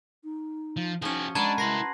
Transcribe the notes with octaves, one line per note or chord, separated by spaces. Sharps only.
D#4
F3
F3 C#4 D#4 F#4 G#4
G#3 D4 F#4 B4 A5 A#5 G#6
E4 A#4 C6 A#6 C7